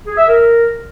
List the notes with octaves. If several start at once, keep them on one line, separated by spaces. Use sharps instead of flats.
G#4
E5
A#4